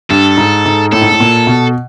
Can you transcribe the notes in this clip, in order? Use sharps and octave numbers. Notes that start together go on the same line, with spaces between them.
G2 A4
G#2
G#2
A2 A4
G#2
A2
A#2
B2